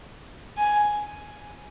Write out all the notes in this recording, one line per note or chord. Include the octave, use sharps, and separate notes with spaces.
G#5